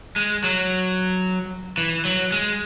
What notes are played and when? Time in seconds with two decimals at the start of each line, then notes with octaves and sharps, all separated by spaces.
0.16 G#3
0.44 F#3
1.77 E3
2.05 F#3
2.32 G#3